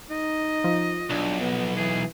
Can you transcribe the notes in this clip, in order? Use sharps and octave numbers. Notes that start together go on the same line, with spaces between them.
D#4 D#5
F3
B1 D4
B3
E3 G#4